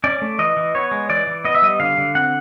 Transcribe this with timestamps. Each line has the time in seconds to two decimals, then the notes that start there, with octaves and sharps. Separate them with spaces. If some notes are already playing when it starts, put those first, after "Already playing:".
0.04 C#4 D5
0.22 A3
0.39 E3 D#5
0.57 E3
0.75 B3 C#5
0.91 G#3
1.10 E3 D5
1.27 E3
1.44 B3 D#5
1.55 E5
1.62 G3 D#5
1.80 D3 F5
1.98 D3
2.15 C4 F#5